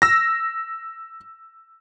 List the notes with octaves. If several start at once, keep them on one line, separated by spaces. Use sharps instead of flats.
E6 A#6